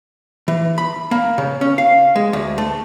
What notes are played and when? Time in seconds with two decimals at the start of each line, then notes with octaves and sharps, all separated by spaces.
0.48 E3
0.78 B5
1.11 A#3
1.38 C#3
1.61 C#4
1.78 F5
2.16 G#3
2.33 D2
2.58 A3